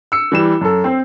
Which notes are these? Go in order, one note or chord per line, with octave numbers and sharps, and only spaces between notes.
E6 C#7
E3 G3 E7
F#2 A4
C4 C5